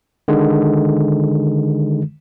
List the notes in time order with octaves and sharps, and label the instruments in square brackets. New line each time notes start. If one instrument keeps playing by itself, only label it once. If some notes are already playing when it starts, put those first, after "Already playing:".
[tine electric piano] D3 D#3 G#3